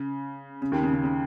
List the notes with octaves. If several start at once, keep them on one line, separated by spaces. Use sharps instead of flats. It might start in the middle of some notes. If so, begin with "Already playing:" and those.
Already playing: C#3
C#3
D#2 D#3
C#3
C#3
C#3